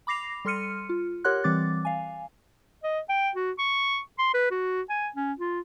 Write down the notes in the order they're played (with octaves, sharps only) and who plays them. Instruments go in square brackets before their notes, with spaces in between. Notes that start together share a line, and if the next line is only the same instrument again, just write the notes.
[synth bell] B5 D6 A#6 C7 F7
G3 A4 C6 F6 C#7 D#7
F4
G4 A#4 C#5 F#5 C6 F#6
E3 G3 C4 D6 A6
F5 G#5
[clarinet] D#5
G5
F#4
C#6
C6
B4
F#4
G#5
C#4
F4